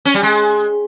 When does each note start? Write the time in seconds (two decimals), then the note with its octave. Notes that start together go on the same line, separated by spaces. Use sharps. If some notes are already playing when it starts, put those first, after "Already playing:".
0.05 C#4
0.14 G3
0.23 G#3